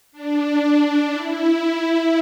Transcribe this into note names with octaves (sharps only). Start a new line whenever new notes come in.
D4
E4